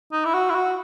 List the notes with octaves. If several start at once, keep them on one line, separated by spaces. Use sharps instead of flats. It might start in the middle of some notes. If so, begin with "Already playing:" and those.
D#4
E4
F#4
E4
F#4